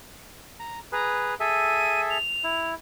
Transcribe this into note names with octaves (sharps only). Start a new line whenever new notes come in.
A#5
G#4 B4 A#5
G#4 A4 E5 D#7
F7
E4